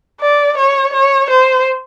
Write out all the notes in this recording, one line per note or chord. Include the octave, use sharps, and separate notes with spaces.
D5
C#5
C#5
C5